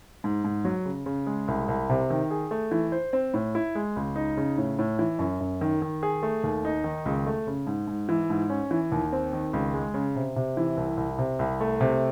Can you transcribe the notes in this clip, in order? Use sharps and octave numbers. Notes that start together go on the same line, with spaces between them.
G#2
G#2
F#3
C#3
C#3
G#3
C2
C2
C3
D#3
G#4
A3
E3
C5
C4
A2
E4
G#3
C#2
D#4
C#3
A2
A2
E3
F#2
F#2
D#3
D#3
G#4
A3
D#2
D#4
D#3
C#2
A3
C#3
G#2
G#2
E3
G#2
C#4
E3
D#2
C4
D#3
C#2
G#3
C#3
C3
C3
E3
C2
C2
C3
C2
A3
C3